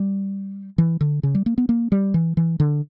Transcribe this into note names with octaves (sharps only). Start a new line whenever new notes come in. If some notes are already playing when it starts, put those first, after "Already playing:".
Already playing: G3
E3
D3
C#3
G3
A#3
B3
A#3
G3
E3
E3
D3